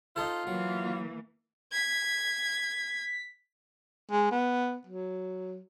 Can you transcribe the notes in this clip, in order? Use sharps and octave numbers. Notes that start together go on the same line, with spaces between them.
D#4 F4 A4 C5
E3 F#3 A#3
G#6 B6
G#3
B3
F#3